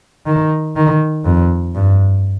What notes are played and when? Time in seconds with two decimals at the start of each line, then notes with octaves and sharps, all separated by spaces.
0.26 D#3
0.76 D#3
1.25 F2
1.75 G2